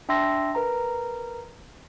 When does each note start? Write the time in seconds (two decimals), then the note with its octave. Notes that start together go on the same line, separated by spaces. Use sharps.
0.09 D4 E5 G5 C6 E6 A#6
0.55 A#4 B4 A#5